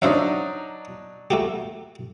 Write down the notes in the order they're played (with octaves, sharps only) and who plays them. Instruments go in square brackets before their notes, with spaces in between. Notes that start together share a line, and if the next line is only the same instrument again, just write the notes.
[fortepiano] F#3 D4 D#4 [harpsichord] C5 E5 F5
[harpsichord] A3 F#4 G4